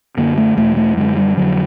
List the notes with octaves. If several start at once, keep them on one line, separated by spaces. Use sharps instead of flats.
F#2 D3 A#3
A3
E2 B2 A3
A3
F#2 D3 G#3
G3
F2 D3 F#3